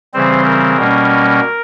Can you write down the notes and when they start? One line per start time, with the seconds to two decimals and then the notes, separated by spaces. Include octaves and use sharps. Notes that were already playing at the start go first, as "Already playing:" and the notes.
0.14 C#3 E3 G3 C4 C5
0.45 A#4
0.77 B2 G3 A#3 C#4